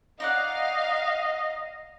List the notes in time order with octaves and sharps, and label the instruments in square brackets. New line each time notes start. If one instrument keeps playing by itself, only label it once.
[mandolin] D#4 D5 F#5 [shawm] D#5 [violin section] F5